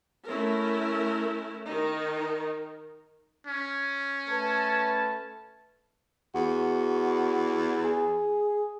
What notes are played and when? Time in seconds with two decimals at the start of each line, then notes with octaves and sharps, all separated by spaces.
0.27 A3 C#4 E4 A#4
1.67 D#3 D#4 A#4
3.47 C#4
4.28 A3 B4 A5
6.35 E2 F#4
7.85 G#4